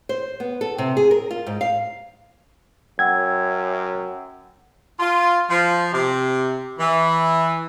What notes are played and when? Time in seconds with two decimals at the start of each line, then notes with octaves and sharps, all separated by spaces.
0.09 C5
0.40 B3
0.61 A4
0.78 C3
0.97 G#4
1.11 A#4
1.31 F4
1.46 G#2
1.61 F5
2.99 F#2 F#5 G5 E6 G#6
4.99 F4
5.50 F3
5.93 C3
6.78 E3